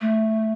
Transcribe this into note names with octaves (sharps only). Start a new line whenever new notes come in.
A3